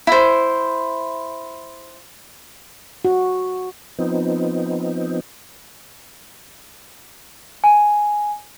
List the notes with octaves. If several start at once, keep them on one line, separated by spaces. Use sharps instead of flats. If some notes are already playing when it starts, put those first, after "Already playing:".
E4 C5
F#4
F3 B3 C4 D#4
G#5